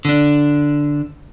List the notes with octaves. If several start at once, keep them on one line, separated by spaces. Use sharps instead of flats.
D3 D4